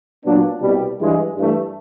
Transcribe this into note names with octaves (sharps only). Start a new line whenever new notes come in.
A#2 F#3 B3 D4
C2 B2 G3
G2 E3 G#3
G2 E3 A3